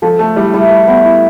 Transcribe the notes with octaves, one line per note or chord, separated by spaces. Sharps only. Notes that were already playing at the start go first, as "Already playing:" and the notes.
F3 A4
A3 A4
G3 E4
G3 E4
B4
B3
E4